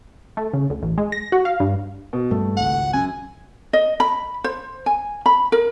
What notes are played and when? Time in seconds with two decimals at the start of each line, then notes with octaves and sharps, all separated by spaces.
0.37 A3
0.53 C#3
0.70 D2
0.82 A1
0.98 G#3
1.12 A#6
1.32 F#4
1.45 F5
1.60 G2
2.13 B2
2.31 G2 A#2 G3 A3
2.57 G#1 C#2 F#5
2.93 F#2 G#5
3.73 D#5
4.00 B5
4.44 C5
4.86 G#5
5.26 B5
5.52 A#4